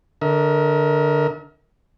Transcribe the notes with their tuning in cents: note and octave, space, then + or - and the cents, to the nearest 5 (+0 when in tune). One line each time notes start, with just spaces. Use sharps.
D3 +0 A#4 +10 E5 -45